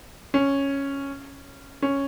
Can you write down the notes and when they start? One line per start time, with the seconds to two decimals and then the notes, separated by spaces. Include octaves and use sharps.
0.34 C#4
1.82 C#4